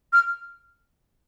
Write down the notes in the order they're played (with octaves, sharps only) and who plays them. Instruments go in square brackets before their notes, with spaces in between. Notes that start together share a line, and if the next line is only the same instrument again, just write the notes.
[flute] F6